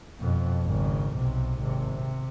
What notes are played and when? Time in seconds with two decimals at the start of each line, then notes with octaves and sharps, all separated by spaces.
0.20 F2 B2
0.65 G#1 C#3
1.17 B1 C3
1.60 G#1 C3
1.95 C3